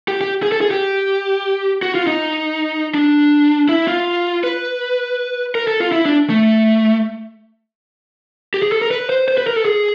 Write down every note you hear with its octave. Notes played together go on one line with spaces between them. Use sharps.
G4
G4
G#4
A4
G#4
G4
F#4
F4
D#4
D4
E4
F4
B4
A#4
A4
F4
E4
D4
A3
G4
G#4
A4
A#4
B4
C5
C5
B4
A#4
A4
G#4